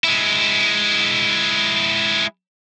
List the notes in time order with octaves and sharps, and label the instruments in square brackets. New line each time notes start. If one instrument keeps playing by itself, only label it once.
[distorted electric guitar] G#3 E4